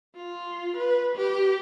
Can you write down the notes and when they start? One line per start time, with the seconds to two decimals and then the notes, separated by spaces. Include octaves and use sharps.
0.16 F4
0.77 B4
1.16 G4